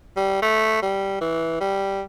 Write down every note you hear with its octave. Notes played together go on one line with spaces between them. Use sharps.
G3
A3
G3
E3
G3